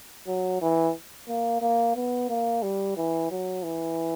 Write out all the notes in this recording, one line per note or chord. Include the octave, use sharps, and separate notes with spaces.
F#3
E3
A#3
A#3
B3
A#3
G3
E3
F#3
E3